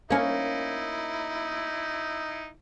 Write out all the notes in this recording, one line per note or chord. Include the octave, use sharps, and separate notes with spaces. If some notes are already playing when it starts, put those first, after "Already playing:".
A#3 C#4 D#4 E4